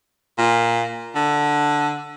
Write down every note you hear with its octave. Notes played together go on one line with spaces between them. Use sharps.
A#2
D3